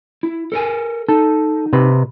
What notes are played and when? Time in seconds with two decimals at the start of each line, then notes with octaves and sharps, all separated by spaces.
0.23 E4
0.52 A4 A#4 G#5
1.09 D#4 A4
1.73 C3 B4